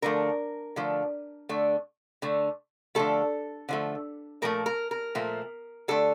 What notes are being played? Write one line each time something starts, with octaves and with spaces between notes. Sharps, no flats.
D3 F3 A3 A#4
D3 F3 A3
D3 A3
D3 A3
D3 F3 A3 A4
D3 F3 A3
A#2 F3 A3 A#4
A#4
A#4
A#2 F3 A3
D3 A3 A4